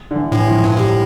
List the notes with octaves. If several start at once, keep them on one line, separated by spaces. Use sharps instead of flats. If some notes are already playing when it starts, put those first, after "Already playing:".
D3
E3
A2
E3
F3
G2
A2 G3